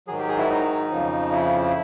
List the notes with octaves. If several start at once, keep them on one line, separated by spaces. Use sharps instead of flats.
G#2 D#3 F#3 G#4
G4
G#4
E4
D#4
F2 C#3 F3
E4